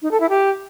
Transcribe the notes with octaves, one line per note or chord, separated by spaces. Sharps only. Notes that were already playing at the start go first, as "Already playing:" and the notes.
D#4
A4
E4
G4